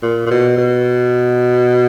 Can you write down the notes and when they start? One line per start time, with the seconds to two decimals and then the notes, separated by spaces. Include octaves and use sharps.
0.03 A#2
0.27 A#2
0.31 B2
0.58 B2